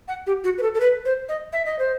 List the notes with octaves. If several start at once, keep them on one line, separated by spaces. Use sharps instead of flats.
F#5
G4
F#4
B4
A4
A4
B4
C5
D#5
E5
D#5
C5